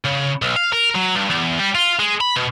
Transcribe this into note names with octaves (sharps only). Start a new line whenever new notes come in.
C#3
B1
F5
A#4
F#3
G2
E2
G3
F4
G#3
B5
B2